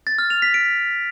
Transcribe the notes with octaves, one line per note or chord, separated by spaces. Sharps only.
A6
F6
F7
B6
D7